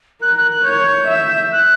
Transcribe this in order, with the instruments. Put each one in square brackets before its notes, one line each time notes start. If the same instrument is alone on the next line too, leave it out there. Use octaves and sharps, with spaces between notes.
[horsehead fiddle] A#4 [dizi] F#6
[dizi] F#6
F#6
[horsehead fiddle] C#5 [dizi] G6
[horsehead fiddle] E5
[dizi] F#6